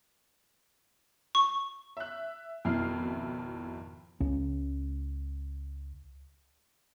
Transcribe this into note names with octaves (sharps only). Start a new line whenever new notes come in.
C#6
E5 F#6
G#1 F2 B2 E4 F6 C7
C#2 C#4